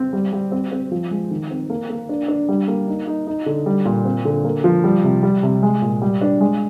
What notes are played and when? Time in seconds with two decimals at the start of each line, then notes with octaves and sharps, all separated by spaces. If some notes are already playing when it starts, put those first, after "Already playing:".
Already playing: C4
0.13 G3
0.33 G3
0.52 C4
0.72 C4
0.91 F3
1.11 G#3
1.31 D#3
1.51 C4
1.70 A#3
1.90 A#3
2.09 D4
2.28 D4
2.49 G3
2.68 A#3
2.88 D#4
3.07 D#4
3.27 D#4
3.46 D3
3.66 G3
3.86 A#2
4.05 C4
4.25 D3
4.45 A#3
4.64 F3
4.84 G3
5.04 C3
5.23 G3
5.43 C3
5.63 G#3
5.82 A#2
6.02 G3
6.21 D4
6.41 G#3